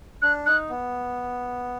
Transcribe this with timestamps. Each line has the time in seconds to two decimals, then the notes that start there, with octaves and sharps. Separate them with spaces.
0.22 D4 F#6
0.46 D#4 F#6
0.70 B3